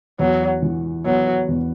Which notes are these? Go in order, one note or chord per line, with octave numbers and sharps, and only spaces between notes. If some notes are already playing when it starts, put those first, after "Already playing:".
E2 F#3
E3
F#3 B3
E2